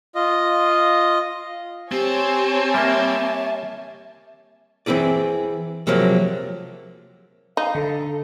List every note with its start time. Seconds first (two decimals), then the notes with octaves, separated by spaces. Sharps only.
0.15 F4 D#5
1.92 C4 G4 C#5 G#5 A5
2.74 G3 A#3 E5
4.86 E3 C4 E4 G#4 D5
5.87 C3 F3 F#3 G#3 A#3
7.57 D#4 F5
7.75 D3 A4